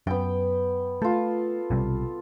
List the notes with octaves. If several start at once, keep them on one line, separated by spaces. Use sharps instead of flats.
F#2 B3 G5
A3 F4 A4
B1 C3 G3